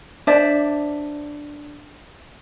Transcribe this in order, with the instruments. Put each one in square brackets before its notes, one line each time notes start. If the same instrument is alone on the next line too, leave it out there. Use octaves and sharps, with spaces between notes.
[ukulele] D4 C5 D5 E5